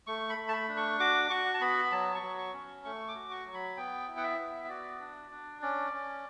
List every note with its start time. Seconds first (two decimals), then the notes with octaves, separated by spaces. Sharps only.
0.07 A3 C#6
0.30 B5
0.38 A3
0.49 A5
0.53 B5
0.69 D4
0.77 C#6
1.00 F#4 D6
1.30 F#4 C#6
1.54 A5
1.61 B3 B5
1.92 F#3 A5
2.15 C#6
2.23 F#3
2.38 C#6
2.54 C#4
2.85 A3 C#6
3.08 D6
3.15 F#4
3.31 C#6
3.46 F#3
3.54 B5
3.77 B3 G5
4.08 E4
4.17 F#5
4.23 E5
4.39 B3
4.64 E5
4.69 F#4 D5
5.00 D4
5.31 D4
5.62 C#4 D5
5.93 C#4